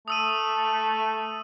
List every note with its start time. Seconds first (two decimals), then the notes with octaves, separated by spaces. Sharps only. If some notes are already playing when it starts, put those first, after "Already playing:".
0.08 A3 D#6 E6 D#7